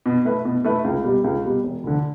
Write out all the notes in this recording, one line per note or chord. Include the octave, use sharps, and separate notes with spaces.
B2
A3 E4 B4
B2
A3 E4 B4
C#2
B2 G3
C#2
B2 G3
E1
D2 D3